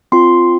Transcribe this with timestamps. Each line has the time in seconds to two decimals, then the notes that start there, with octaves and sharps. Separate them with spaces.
0.12 C4 F4 C6